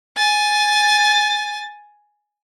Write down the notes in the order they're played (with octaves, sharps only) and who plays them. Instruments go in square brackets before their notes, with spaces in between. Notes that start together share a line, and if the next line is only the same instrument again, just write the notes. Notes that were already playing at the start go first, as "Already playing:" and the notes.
[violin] G#5 A6